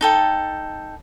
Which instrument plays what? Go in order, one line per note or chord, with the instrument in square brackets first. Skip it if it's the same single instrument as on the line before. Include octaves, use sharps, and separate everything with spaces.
[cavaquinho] D#4 A4 G5